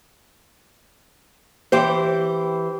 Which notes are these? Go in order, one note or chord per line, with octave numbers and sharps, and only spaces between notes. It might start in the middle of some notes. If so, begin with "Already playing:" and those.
E3 G4 C5